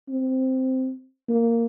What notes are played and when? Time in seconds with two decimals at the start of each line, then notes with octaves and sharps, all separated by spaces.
0.09 C4
1.29 A#3